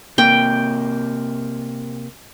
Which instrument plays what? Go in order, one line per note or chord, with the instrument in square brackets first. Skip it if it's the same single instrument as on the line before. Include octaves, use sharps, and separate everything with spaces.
[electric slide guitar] C3 A#3 [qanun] G5